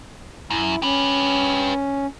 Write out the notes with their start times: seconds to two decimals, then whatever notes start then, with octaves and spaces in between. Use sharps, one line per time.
0.50 F#2 E4
0.82 C#4 G4 B4